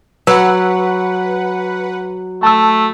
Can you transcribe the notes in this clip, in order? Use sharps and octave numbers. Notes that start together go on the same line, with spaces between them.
F#3 B4 F#5 E6
A3 A5 E6